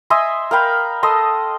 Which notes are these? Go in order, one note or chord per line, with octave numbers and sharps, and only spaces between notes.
D#5 E5 G#5 C6
A#4 F5 G5 B5
A4 D#5 C6